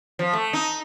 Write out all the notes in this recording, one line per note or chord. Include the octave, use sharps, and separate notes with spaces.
F3
A3
D#4